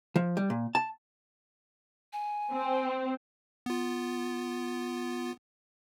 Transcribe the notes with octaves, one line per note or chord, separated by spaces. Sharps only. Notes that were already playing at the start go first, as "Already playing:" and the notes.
F3
G3
A#2
A5
G#5
C4
B3 F4